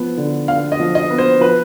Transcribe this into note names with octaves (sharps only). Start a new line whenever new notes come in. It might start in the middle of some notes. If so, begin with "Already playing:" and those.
Already playing: F3 B3
D3
D3 F5
D#5
F3
D#5
B3
C5
F3 B4